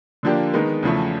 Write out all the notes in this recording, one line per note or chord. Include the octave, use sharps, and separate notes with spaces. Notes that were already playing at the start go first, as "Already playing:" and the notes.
D3 F3 A#3 D4 G4
D#3 G#3 B3 D#4
E2 C#3 F3 A3